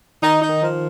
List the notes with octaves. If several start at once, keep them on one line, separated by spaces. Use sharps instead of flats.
D#3 D#4
D#4
D#3
F3